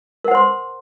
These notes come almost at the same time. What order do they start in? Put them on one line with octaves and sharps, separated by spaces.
A#4 F#5 C5 C6